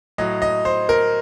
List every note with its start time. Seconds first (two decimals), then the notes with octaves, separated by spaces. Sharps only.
0.18 A2 F#3 D#5
0.42 D#5
0.65 C5
0.89 A#4